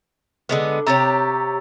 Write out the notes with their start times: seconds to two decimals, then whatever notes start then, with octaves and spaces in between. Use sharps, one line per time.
0.49 D3 G#3 B3
0.87 C3 G4 C#5 A#5 E6 A6